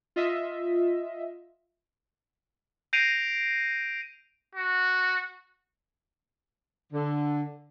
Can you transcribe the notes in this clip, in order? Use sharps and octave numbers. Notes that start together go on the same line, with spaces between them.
F4 D#5 E5
G6 A#6 C7 D7 D#7 F7
F#4
D3